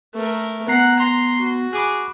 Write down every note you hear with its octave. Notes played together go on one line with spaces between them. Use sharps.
A3 A#4
B3 F#5 A#5 C7
A#5 C6
F#4
G#4 B5 D6 F#6